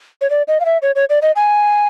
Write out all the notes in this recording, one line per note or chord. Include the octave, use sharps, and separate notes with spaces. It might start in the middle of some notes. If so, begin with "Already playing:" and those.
C#5
D5
D#5
F5
E5
C#5
C#5
D5
D#5
G#5